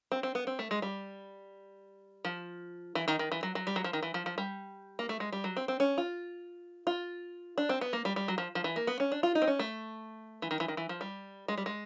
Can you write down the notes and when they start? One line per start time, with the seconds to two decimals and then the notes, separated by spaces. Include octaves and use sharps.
0.12 C4
0.23 C4
0.35 B3
0.47 C4
0.59 A3
0.71 G#3
0.82 G3
2.25 F3
2.95 E3
3.08 D#3
3.19 D#3
3.32 E3
3.43 F#3
3.55 F#3
3.67 G3
3.76 F#3
3.84 F3
3.93 D#3
4.03 E3
4.14 F3
4.26 F3
4.38 G3
4.99 A#3
5.09 A3
5.20 G#3
5.32 G3
5.44 F#3
5.57 C4
5.68 C4
5.80 C#4
5.98 F4
6.87 F4
7.58 D4
7.69 C4
7.81 B3
7.93 A#3
8.05 G3
8.16 G3
8.28 F#3
8.38 F3
8.55 F3
8.64 E3
8.76 A#3
8.87 B3
9.00 C#4
9.12 D4
9.23 F4
9.35 D#4
9.42 C4
9.47 C#4
9.59 A3
10.42 E3
10.51 D#3
10.60 E3
10.68 D#3
10.77 E3
10.89 F3
11.01 G3
11.48 G#3
11.58 G3
11.66 G#3